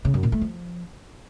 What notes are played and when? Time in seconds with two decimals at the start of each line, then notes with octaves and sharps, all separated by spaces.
0.05 C#3
0.14 F#2
0.23 A#2
0.32 A3
0.41 F3